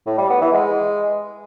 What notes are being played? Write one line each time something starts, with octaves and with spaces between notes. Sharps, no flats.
A2
G3
B3
E3
G#3